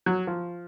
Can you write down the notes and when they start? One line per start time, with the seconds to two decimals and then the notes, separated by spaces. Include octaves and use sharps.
0.06 F#3
0.27 F3